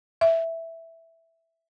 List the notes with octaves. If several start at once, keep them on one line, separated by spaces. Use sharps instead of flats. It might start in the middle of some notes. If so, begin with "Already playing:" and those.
E5